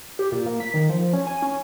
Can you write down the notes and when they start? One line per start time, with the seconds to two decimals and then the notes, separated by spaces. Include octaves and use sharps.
0.19 G4
0.32 A#2
0.46 A#3
0.60 B6
0.74 D#3
0.89 F3
1.13 C#4
1.27 G#5
1.42 C#4